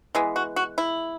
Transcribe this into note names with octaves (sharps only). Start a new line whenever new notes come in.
E3 G#3 B3
F#4
F#4
E4